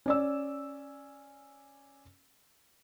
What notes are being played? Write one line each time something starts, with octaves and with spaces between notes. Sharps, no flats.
C#4 D5 E6